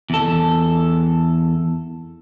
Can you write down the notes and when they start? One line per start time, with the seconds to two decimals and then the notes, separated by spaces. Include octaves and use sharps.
0.10 E2 A4